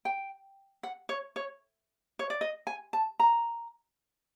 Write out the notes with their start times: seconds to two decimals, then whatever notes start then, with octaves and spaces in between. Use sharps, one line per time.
0.05 G5
0.83 F#5
1.09 C#5
1.36 C#5
2.19 C#5
2.30 D5
2.41 D#5
2.67 G#5
2.93 A5
3.20 A#5